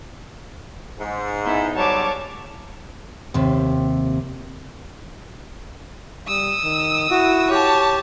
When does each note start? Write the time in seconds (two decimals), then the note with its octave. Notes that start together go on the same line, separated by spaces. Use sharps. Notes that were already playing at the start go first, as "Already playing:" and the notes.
0.98 G#2
1.44 B3 D#4 E4
1.75 G#2 F#3 G3 C#5 A5 D6
3.34 D#2 C3
6.28 G3 D#6 E6
6.64 D#3
7.10 E4 F#4
7.50 G4 C#5 A5